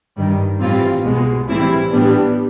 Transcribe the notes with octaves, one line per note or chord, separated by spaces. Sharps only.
G2 D#3 G3
A2 E3 G3 C4 F4
C2 B2 G#3
A2 E3 G3 C4 E4
A2 E3 G3 B3 D4